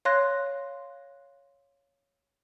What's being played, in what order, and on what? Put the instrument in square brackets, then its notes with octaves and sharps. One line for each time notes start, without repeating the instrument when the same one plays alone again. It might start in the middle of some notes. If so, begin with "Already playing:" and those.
[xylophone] C#5 F5 C6 F#6 A#6